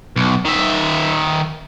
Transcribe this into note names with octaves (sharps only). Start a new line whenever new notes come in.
B1
D#3 E5